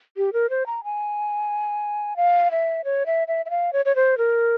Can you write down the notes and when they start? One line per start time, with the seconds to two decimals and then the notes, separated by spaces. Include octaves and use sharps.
0.17 G4
0.33 A#4
0.50 C5
0.66 A#5
0.84 G#5
2.16 F5
2.51 E5
2.84 C#5
3.06 E5
3.28 E5
3.46 E5
3.50 F5
3.73 C#5
3.85 C#5
3.96 C5
4.18 A#4